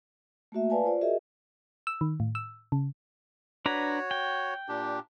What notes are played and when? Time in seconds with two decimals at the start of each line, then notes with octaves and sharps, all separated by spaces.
0.52 A3 A#3 F#4 E5
0.70 B4 D5 F5 G#5 A5
0.84 F4 C5 D5
1.01 F#4 G#4 A#4 D#5 E5
1.87 E6
2.01 D#3
2.20 A2
2.35 E6
2.72 C#3
3.66 D4 F#4 B4 C#5 A#5
4.11 G5
4.69 A#2 D4 G4